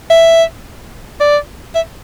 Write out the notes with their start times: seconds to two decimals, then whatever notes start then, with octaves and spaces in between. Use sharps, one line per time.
0.10 E5
1.20 D5
1.75 E5